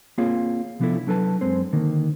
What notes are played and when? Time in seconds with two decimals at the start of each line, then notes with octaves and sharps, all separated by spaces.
0.18 A#3 C4 F4 G#4 C#5 F5
0.80 C3 F3 B3 D4 E4 A4
1.07 F#3 D4 A4 B4 A5
1.41 F#2 G#3 C4 C5
1.73 D3 D#3 A#3